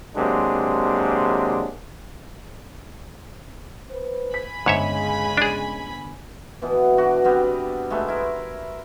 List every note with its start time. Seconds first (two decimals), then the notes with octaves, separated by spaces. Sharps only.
0.16 C3 F#3 G#3 A#3 D4
3.91 B4 C5
4.34 G#5 B5 B6
4.66 G1 G#2 C#3 G#3 C#5 E5
5.38 D4 G#4
6.62 B2 E3 B3
6.97 D4 F#4
7.24 G3 B3 C4
7.90 G#3 A3 B4 E5
8.08 E4 A#4